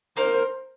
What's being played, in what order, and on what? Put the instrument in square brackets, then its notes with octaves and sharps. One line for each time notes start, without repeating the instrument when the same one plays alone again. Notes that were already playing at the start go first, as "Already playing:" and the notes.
[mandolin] A#3 D#4 A#4 [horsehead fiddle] C5